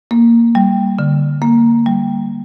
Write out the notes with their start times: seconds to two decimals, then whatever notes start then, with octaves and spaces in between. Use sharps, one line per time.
0.11 A#3
0.55 G3
0.99 D3
1.42 A#3
1.86 G3